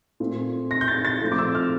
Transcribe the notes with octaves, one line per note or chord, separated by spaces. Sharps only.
A#2 A3 C4
A#6
G6
A6
A6
A#2 F3 A3 C4
D6
E6
F6